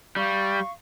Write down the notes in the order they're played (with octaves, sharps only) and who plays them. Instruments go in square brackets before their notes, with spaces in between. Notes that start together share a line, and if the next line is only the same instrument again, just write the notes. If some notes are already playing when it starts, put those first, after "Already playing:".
[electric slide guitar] G3 [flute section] F5 C#6